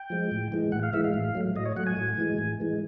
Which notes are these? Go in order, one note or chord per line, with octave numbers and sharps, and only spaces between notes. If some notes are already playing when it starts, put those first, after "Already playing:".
Already playing: G5
F3 G#3
A2
E3 G#3
A2 F#5
F5
E3 G#3 E5
F5
A2
F#3 A3
A2 D#5
C#5
F#3 A3 F#5
G#5
A2
E3 G#3
A2
E3 G#3